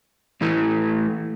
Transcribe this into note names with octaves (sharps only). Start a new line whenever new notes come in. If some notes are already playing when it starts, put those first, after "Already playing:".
A2 E3 A3